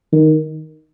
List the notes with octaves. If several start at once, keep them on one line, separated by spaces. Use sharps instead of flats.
D#3